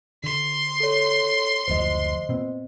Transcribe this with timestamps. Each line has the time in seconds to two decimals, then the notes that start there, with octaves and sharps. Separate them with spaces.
0.24 D3 C6
0.80 A4 C#5
1.68 F#1 D2 F3 C5 D#5
2.29 A#2 B3 C4